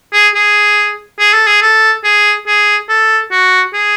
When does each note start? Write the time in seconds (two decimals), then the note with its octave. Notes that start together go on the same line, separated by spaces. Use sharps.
0.13 G#4
0.35 G#4
1.20 G#4
1.33 A4
1.47 G#4
1.62 A4
2.04 G#4
2.47 G#4
2.89 A4
3.32 F#4
3.74 G#4